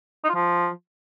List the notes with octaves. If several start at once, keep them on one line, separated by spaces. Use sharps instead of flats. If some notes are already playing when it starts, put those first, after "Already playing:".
D#4
F4
F3